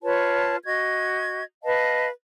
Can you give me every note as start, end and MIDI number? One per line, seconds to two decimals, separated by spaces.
0.03 0.56 65
0.03 0.56 71
0.03 0.56 73
0.03 0.56 81
0.66 1.43 66
0.66 1.43 75
0.66 1.43 92
1.64 2.08 71
1.64 2.08 75
1.64 2.08 77
1.64 2.08 81